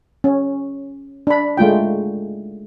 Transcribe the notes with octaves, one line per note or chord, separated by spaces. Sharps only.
C#4
D4 B5
G#3 A3 F4 G5